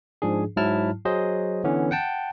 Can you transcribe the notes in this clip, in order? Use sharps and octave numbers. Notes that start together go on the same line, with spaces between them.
G#2 F3 D4 G#4
G#2 F#3 E4 A5 F6
F#3 G#4 C5 D#5
D3 E3 B3 C#4
F#5 G5 A5